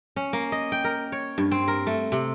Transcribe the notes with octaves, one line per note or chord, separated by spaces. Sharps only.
C#4
A#3
D#5
G5
A#4
C#5
G2
C4
A#4
A3
C3